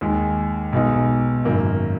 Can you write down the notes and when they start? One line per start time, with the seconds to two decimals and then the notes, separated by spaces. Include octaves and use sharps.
0.01 D#2 D#3 G#3
0.72 B1 B2 G#3 D#4
1.45 G#1 F#2 D#3 A#3